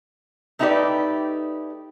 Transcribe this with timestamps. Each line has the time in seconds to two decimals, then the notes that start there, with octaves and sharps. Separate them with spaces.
0.59 A3 D#4 E4 G4 B4 D5